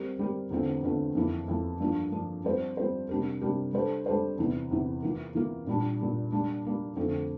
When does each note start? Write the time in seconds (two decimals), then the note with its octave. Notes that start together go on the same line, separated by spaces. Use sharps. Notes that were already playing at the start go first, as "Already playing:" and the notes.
Already playing: G3 C4 G4 A#4
0.19 G3 C4 G4 A#4
0.51 E2 D3 A3 C4 F4
0.83 E2 D3 A3 C4 F4
1.15 F2 E3 A#3 E4
1.48 F2 E3 A#3 E4
1.80 G2 F3 A#3 D4 F4
2.12 G2 F3 A#3 D4 F4
2.44 G3 C4 F4 C5
2.77 G3 C4 F4 C5
3.09 C3 G3 D4 G4 A#4
3.41 C3 G3 D4 G4 A#4
3.73 G3 D4 A4 C5
4.06 G3 D4 A4 C5
4.39 E2 C3 E3
4.71 E2 C3 E3
5.02 E3 A#3 F4 A#4
5.35 E3 A#3 F4 A#4
5.67 A#2 G3 D4
5.99 A#2 G3 D4
6.32 G3 A#3 D4
6.65 G3 A#3 D4
6.96 F2 D3 A3 C4 F4